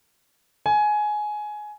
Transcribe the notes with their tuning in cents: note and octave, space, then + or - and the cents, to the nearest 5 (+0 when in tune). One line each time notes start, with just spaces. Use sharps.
G#5 +15